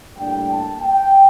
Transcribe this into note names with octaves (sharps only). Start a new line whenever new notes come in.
A2 G3 A#3 D4 G5
A5
G5